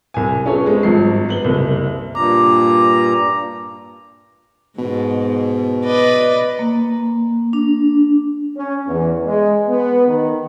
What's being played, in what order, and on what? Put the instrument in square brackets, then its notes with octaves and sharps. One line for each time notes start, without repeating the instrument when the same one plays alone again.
[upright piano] C2 G#5
B3 C#4 F4 G#4 A4 C#5
G#3 C4
G#1 G2 F3 C7
B3 F#7 G7
F#1 C2
[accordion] G2 A#2 A#5 [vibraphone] D6
[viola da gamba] G#2 [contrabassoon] B2
[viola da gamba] B4 D5 D#5
[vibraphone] A#3
D4
[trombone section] C#4
E2
G#3
B3
D#3